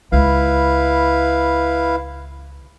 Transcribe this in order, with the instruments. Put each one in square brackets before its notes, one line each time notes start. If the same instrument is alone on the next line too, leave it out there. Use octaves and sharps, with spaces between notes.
[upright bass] C#2 [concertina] E4 B4 F5